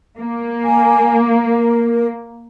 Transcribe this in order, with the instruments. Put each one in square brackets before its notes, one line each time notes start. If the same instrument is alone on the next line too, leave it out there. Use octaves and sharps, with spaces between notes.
[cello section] A#3
[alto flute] G#5
A#4